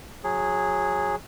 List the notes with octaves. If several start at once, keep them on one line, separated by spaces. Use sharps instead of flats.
F#3 G#4